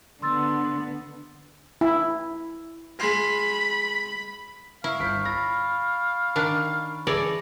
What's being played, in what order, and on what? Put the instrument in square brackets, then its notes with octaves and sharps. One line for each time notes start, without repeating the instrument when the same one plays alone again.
[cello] D3 B3 [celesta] C6 E6 A6
[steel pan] E4
[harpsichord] G#3 F4 [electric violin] B5
[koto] E4 [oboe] F5 [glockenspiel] C#6
[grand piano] G1 B5 B6 [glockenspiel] G6 D7
[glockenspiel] B5 E6 A6 [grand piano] A#6
[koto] D#3 D4
[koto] E3 C#5 D5 [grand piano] G#4 A4 [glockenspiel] E6 A#6